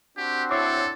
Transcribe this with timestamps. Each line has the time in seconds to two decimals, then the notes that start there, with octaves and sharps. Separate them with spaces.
0.17 C4 D4 F#4 G4
0.51 E4 A4 C#5 D6 C7